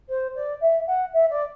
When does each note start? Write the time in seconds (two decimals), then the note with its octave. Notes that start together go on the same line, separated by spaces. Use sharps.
0.09 C5
0.35 D5
0.61 E5
0.87 F#5
1.13 E5
1.30 D5